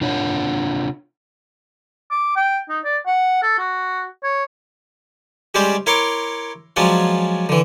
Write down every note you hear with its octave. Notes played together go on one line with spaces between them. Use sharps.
C3 D4 F4 C#5 F#5
D6
G5
D#4
D5
F#5
A4
F#4
C#5
G3 G#3 C#4 G4 C5 D5
E4 A#4 C#5 C6 D6
F3 F#3 G#3 C#4 D4 F4
D3 E3